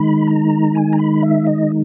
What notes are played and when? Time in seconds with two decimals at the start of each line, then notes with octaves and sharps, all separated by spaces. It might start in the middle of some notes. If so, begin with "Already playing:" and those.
Already playing: D#3 G#3 D#4 B5
0.27 A#5
0.75 G#5
0.93 A#5
0.98 B5
1.23 E5
1.47 D#5